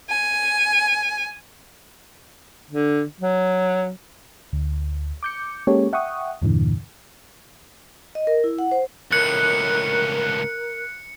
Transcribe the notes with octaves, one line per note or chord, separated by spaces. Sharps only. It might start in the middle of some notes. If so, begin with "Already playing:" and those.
G#5
D3
F#3
D2
D6 G6 C#7
G#3 A#3 C#4 G4 A4 C#5
E5 F#5 G5 C#6 D#6
E2 G2 A#2 D3 E3
D#5
A#4
E4
F#5
C5
C#2 A2 A#4 F#6 C#7